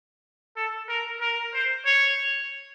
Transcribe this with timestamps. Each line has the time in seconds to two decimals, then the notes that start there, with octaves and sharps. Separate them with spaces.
0.57 A4
0.89 A#4
1.21 A#4
1.54 C5
1.86 C#5